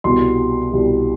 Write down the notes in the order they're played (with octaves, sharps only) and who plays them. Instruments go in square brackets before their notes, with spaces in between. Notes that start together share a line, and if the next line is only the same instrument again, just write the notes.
[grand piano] C2 B2 G3 C6
C2 B2 G3